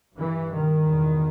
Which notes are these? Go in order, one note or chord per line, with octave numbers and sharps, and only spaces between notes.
G2 E3
D#3
E2 B2